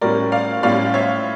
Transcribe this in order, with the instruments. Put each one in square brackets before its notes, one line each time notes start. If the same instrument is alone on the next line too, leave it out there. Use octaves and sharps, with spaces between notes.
[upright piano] A2 G3 C#4 A#4 D5
D5 F5
A2 G3 C#4 D5 F5
C#5 E5